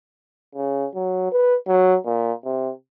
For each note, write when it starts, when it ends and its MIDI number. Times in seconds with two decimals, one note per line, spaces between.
0.55 0.86 49
0.95 1.28 54
1.32 1.57 71
1.68 1.96 54
2.05 2.33 46
2.44 2.71 48